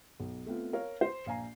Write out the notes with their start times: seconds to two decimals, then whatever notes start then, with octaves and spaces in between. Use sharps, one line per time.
0.20 B1
0.46 A3 B3 C4 F4
0.73 A#4 C#5 F5
1.01 C5
1.26 A#1 F5 G#5 A#5 C7